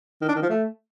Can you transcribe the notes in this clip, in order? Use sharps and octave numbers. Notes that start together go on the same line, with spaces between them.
D#3
D4
D#3
F3
A3